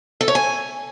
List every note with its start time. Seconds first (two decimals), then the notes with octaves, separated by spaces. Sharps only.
0.21 A4
0.28 C#5
0.35 G#5